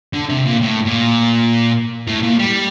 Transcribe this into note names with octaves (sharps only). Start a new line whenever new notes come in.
D3
C3
A#2
A2
A#2
A2
A#2
G3